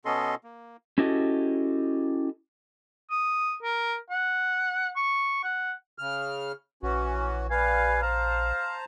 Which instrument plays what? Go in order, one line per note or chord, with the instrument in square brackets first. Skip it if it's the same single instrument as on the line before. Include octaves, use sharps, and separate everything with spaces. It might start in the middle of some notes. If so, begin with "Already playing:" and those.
[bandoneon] B2 B3 C#4 A4 D#5 C6
A#3
[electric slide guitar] C#4 E4 F#4 G4 A4 D#5
[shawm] D#6
A#4
F#5
C#6
F#5
[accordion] C#3 F6
[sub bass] A#1 [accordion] E3 C#4 F#4
[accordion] G3 B4 F5 [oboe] G#5
[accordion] C5 A5 A#5 [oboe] F5